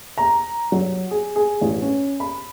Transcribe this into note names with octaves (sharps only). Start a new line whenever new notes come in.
A#5
F#3
G#4
G#4
A1
C#4
B5